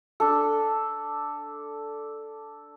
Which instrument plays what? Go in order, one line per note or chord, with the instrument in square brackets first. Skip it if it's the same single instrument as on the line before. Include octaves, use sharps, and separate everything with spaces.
[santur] D4 A4